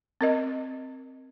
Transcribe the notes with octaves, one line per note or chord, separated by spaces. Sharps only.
C4 A#4 D#5